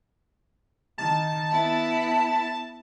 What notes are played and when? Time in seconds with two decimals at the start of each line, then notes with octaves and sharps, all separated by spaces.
0.98 D#3 A5
1.49 B3 E4 B5